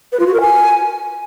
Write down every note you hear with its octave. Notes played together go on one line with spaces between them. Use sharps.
B4
F4
F#4
A#4
G#5